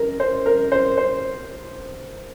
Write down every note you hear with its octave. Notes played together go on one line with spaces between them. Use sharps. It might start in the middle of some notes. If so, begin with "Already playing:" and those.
Already playing: A#4
C5
A#4
C5
C5